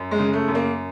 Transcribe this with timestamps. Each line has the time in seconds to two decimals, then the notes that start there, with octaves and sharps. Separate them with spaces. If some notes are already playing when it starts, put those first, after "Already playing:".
Already playing: F#2
0.11 G#3
0.19 C#3
0.33 A3
0.48 F#2
0.55 A#3